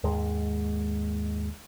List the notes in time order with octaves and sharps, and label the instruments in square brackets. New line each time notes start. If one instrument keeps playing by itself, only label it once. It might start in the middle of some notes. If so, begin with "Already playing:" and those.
[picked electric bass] D#2 G#2 G#3